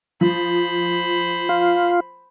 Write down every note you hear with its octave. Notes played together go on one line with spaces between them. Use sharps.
F3 C5 B5
F4